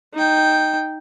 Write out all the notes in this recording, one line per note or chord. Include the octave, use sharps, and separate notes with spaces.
D#4 G5